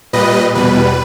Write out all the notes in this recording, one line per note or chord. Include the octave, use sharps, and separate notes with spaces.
A#2 G3 B4 D#5
E2 B2 G3 B4